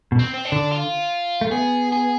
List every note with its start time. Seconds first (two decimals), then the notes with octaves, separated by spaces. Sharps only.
0.12 B2
0.19 C4
0.34 C4
0.45 D4
0.52 D3
0.71 F4
1.41 A3
1.51 B3 G#4
1.92 G#4